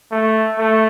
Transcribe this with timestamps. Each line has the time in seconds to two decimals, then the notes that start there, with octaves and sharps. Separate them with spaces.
0.11 A3
0.59 A3